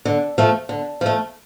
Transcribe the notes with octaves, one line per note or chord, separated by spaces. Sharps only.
D3
F3 A3
D3
F3 A3